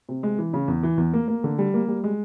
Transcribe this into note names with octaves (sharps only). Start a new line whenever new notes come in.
C3
G#3
E3
C#3
E2
E3
E2
A#3
A#3
D3
G3
A#3
G3
G#3